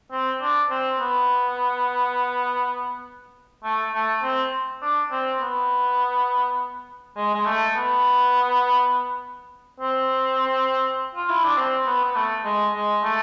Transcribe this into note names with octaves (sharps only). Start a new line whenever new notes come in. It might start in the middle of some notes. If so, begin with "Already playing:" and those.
C4
D4
C4
B3
A3
A3
C4
D4
C4
B3
G#3
G#3
A3
B3
C4
F4
E4
D4
C4
B3
B3
A3
G#3
G#3
A3